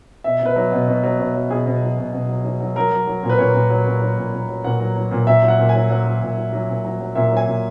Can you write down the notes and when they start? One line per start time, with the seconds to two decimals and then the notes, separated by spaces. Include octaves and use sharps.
0.24 B2 E5
0.41 B2 B4
0.56 F#3
0.72 B2
0.88 B2
1.03 F#3
1.19 B2
1.34 F#3
1.50 B2 G#4
1.66 B2
1.82 F#3
1.98 B2
2.13 B2
2.29 F#3
2.45 F#3
2.60 F#3
2.76 F#3 A#4
2.92 F#3
3.07 F#3
3.23 A#2
3.30 B4
3.39 A#2 C#5
3.54 A#2
3.70 F#3
3.86 A#2
4.02 F#3
4.17 A#2
4.33 A#2
4.49 F#3
4.64 A#2 F#5
4.80 F#3
4.96 F#3
5.11 A#2
5.27 A#2 E5
5.43 F#3
5.48 F#5
5.59 A#2
5.69 G#5
5.74 F#3
5.90 F#3 F#5
6.06 F#3
6.22 A#2
6.37 F#3
6.53 F#3
6.68 A#2
6.84 F#3
7.00 F#3
7.15 A#2 E5
7.31 F#3
7.37 G#5
7.47 A#2